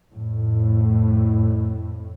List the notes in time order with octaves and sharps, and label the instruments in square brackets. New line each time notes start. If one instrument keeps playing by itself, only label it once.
[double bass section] F2 A2